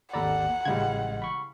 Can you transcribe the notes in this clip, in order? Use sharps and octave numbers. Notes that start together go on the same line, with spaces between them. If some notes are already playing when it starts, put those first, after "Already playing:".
G#1 D#2 A4 D5 F#5 A#5 B5
A1 C#3 E3 G3 G#3 G#6
B5 C#6